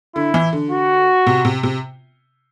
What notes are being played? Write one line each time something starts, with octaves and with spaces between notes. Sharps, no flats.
D3 E4
E3
D3
F#4
C3
C3
C3